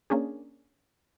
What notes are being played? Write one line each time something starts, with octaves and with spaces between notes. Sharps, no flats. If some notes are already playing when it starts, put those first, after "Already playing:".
A#3 C#4 D4 G#4